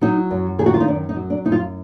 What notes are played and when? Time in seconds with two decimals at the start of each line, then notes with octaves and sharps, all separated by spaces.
0.01 F#3 D#4
0.31 F#2
0.59 D#3 G#4
0.66 F#4
0.74 F4
0.80 D#4
0.87 F#2 D4
1.09 D#4
1.16 F#3
1.30 D4
1.45 F#2 D#4
1.52 F4